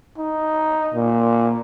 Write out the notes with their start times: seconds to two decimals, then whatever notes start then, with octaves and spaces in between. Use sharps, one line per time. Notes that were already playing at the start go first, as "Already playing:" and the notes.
0.18 D#4
0.94 A#2